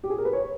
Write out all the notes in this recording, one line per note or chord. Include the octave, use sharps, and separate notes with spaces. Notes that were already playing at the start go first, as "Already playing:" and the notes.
G4
G#4
A#4
B4
C#5